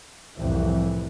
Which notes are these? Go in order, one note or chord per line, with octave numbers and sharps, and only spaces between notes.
C2 F2 A2 E3